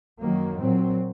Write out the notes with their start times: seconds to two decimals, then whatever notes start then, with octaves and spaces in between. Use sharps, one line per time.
0.22 F#2 D#3 F#3 A#3
0.60 A#2 F#3 C4